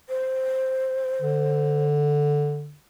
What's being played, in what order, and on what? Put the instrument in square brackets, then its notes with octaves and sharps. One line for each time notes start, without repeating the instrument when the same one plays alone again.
[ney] C5
[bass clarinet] D3